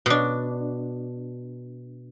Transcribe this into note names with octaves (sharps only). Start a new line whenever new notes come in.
B2 D4